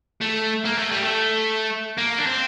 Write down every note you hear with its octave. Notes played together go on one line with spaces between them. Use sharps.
A3
A#3
A3
G3
A3
A#3
D4
C4